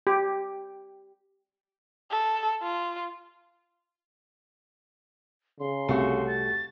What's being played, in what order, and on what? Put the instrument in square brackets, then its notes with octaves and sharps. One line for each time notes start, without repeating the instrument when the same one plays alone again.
[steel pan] G4
[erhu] A4
F4
[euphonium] C#3 [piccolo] C6
[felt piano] C2 [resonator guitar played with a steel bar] A3 F#4
[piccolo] A6